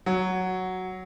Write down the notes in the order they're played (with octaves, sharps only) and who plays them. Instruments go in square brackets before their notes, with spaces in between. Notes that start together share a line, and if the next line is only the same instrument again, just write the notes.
[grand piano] F#3